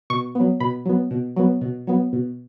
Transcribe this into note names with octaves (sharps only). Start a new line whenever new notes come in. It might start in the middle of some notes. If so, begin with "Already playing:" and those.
B2 C#6
F#3 B3
B2 B5
F#3 B3
B2
F#3 B3
B2
F#3 B3
B2